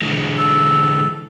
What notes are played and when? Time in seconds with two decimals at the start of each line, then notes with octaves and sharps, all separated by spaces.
0.02 D3 E3 G#3
0.37 A4